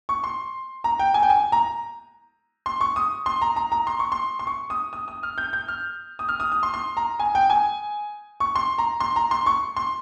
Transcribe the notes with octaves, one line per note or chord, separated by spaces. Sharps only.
C#6
C6
A#5
G5
G#5
G5
G#5
A#5
C6
C#6
D#6
C6
A#5
A#5
A#5
C6
C#6
C6
C6
C#6
D#6
D#6
D#6
F6
G6
G6
F6
D#6
F6
D#6
D#6
C6
C6
A#5
G#5
G5
G#5
C#6
C6
A#5
C6
A#5
C6
C#6
C6